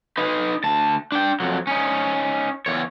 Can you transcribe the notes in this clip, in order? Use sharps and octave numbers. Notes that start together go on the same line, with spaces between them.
D#4 B4
D2 A5
D4 G5
F2 F#3
C#4 D#4
E2 C#5